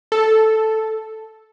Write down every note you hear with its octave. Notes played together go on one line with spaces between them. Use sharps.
A4